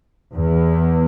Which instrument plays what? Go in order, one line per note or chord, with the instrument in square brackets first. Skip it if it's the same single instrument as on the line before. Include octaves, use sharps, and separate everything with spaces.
[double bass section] E2